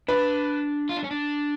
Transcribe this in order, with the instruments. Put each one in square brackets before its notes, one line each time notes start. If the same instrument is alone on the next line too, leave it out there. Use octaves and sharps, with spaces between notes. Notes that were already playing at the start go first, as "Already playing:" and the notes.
[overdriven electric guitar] D4 [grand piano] B4
[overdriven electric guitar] F4
D4
C#4
D4